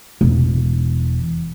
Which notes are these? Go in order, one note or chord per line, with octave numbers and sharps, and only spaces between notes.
E1 E3